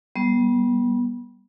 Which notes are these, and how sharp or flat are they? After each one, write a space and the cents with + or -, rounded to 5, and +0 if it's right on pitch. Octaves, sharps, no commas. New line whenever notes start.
G3 -10 B3 -30